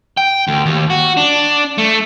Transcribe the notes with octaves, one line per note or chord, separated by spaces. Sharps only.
G5
D2
D#2
F#4
D4
A3